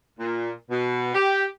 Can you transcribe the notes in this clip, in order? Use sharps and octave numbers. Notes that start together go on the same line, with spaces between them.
A#2
B2
G4